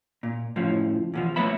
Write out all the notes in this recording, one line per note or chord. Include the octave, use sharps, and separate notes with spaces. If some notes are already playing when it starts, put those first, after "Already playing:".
A#2
F#2 A2 C#3 F3
E2 B2 F3
F#3 A3 B3 E5 B5